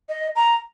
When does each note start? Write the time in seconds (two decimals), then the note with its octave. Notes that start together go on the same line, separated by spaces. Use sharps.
0.09 D#5
0.36 A#5